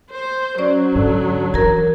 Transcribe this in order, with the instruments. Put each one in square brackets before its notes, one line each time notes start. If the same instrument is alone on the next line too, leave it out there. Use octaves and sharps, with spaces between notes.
[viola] C5
[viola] F#3 [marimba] C#4 C5 D5
[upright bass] G#2 [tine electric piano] D3 D4 A4
[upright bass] E3 [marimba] A#4 A#5 [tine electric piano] G#6